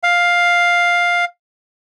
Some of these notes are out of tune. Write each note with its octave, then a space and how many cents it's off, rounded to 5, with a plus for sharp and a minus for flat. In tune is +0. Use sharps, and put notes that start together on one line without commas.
F5 +5